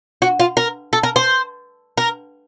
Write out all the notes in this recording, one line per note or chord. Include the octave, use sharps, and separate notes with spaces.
F#4
F4
A#4
A4
A#4
C5
A#4